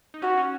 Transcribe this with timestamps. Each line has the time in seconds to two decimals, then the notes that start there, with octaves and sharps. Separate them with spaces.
0.14 D#4
0.22 C#4 F#4
0.38 C#4